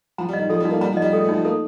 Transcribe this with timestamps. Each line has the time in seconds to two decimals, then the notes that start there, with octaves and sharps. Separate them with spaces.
0.18 F3 A#5
0.29 G3
0.33 D#5
0.39 D#3
0.50 F3 A4
0.60 G3
0.65 D#4
0.71 A#3
0.81 G3 A#5
0.93 F3
0.97 D#5
1.02 G3
1.13 A3 A4
1.24 A3
1.29 F3 D#4
1.45 A#3 A4